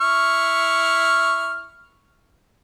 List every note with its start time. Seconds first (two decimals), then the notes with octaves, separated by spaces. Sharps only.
0.01 E4 C#6 F6